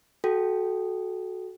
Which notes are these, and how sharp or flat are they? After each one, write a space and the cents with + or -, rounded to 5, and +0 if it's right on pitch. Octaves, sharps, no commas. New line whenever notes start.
F#4 +0 A4 -25 G5 +0